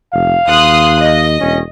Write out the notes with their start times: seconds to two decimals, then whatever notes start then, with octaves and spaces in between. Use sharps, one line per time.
0.13 F1 F5
0.48 D#2 C6 D#6 F#6
0.99 D#5
1.41 E1 C#4